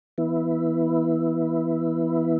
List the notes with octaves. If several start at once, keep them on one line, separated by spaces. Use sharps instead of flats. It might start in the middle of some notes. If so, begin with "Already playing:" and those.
E3 B3 E4